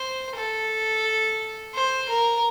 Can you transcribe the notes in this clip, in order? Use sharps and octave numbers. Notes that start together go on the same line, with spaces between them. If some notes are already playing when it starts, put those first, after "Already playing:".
Already playing: C5
A4
C5
A#4